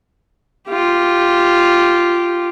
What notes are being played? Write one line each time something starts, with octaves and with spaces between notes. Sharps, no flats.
F4 G4